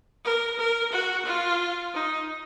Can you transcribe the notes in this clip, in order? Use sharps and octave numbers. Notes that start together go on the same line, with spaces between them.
A#4
A#4
F#4
F4
D#4